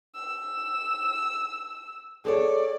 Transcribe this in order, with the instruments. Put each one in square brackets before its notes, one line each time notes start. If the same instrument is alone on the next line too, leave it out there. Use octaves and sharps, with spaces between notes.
[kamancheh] E6
[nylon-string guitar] G#4 A4 C#5 [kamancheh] D5